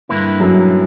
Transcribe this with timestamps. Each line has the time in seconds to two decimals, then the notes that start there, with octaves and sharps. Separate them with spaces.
0.09 G2 D3 A#3 E4 B4
0.40 F#2 F#3